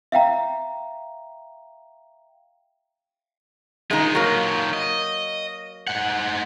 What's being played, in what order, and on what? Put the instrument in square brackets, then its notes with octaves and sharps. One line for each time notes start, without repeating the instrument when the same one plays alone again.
[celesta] E5 F5 G5 A#5
[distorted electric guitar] D#3 F4 [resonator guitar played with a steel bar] G#3 D#4
[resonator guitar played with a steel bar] F#3 A#3
[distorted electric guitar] D#5
G#2 F#5